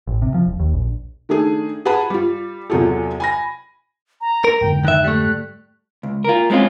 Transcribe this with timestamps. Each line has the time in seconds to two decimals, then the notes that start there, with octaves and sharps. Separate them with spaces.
0.07 A1
0.22 C3
0.34 F3
0.46 E1
0.60 D#2
0.74 A#1
1.29 D#3 A3 D4 G#4
1.85 G#4 B4 F#5 A5 B5
2.10 G3 F4
2.70 E2 C3 F#3 F4 G#4 A4
3.20 G#5 B5 A#6
4.21 A#5
4.44 A#4
4.61 F2 G#2 D3 G5
4.85 D#3 E5 F#6
5.04 G3 A3
6.03 C#2
6.25 F4 A#4
6.50 G3 G#3 C4 C#4 F4